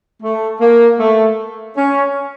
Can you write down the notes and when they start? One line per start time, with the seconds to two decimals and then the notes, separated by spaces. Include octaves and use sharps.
0.22 A3
0.61 A#3
0.99 A3
1.76 C#4